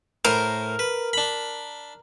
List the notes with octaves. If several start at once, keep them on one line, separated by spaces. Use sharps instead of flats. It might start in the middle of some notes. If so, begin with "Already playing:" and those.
A2 A#4 C5 D#6
B4
D4 B5